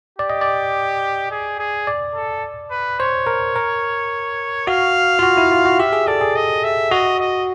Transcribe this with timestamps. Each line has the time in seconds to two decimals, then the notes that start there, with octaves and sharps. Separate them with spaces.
0.18 G4 D5
0.30 D#5
0.41 D5
1.31 G#4
1.59 G#4
1.87 D5
2.15 A4
2.71 B4
3.00 C5 C#5
3.27 A#4
3.56 A#4
4.67 F#4 F5
5.19 F4
5.23 F#4
5.37 E4
5.52 F4
5.65 F#4
5.79 G4 E5
5.93 G#4
6.07 A4 D5
6.21 G#4
6.36 D#5
6.64 E5
6.91 F#4 D#5
7.19 D#5